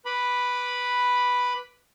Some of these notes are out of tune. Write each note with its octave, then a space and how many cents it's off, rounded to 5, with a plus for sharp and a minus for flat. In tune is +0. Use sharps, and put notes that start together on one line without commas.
B4 +0 B5 +0 D6 +0